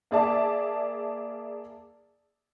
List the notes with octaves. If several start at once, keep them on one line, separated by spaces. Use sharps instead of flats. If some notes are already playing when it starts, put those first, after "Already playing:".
A#3 G#4 D5 E5 A5